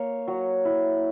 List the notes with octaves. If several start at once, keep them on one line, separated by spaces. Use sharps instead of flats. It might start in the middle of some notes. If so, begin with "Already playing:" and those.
Already playing: A#3 C#5
F#3
E4